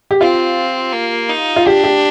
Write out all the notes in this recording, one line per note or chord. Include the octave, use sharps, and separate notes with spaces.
G4
C4 F4
A#3
D#4
F4
D4 G4
G4